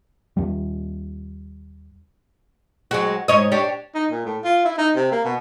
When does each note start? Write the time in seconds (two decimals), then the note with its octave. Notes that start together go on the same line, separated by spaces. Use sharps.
0.37 D#2 G3
2.91 F#3 G#3 F#4
3.28 G#2 C#5 D#5
3.52 D4 G4 C#5
3.95 D#4
4.11 A#2
4.26 A2
4.44 F4
4.65 E4
4.78 D#4
4.96 C3
5.12 A#3
5.24 B2